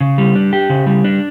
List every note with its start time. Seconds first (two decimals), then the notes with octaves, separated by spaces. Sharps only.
0.01 C#3
0.18 G3
0.35 D4
0.53 G4
0.70 C#3
0.87 G3
1.04 D4